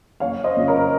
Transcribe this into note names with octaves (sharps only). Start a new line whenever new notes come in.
F#1 C#5 F5
C5 D#5
F#2 C#3 F3
A#4 C#5